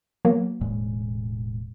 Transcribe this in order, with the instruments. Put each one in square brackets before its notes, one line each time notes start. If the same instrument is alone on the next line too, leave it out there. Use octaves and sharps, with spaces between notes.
[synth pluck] F#3 A#3 B3
[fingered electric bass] E1 A2 G#3